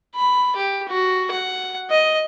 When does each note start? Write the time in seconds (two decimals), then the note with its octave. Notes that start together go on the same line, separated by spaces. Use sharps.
0.15 B5
0.56 G4
0.88 F#4
1.31 F#5
1.90 D#5